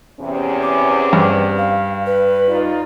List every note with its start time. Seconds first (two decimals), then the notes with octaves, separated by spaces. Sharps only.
0.21 E2 C3 C#4
0.62 D6
1.13 G2
1.58 F5
2.06 B4
2.48 D#4 F4 D5